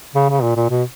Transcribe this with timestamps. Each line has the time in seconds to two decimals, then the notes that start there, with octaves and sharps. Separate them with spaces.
0.15 C#3
0.29 C#3
0.42 A#2
0.56 A#2
0.70 B2